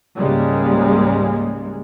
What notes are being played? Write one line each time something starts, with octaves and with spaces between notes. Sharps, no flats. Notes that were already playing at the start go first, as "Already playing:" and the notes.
C#2 G#2 C#3 G3 G#3 A#3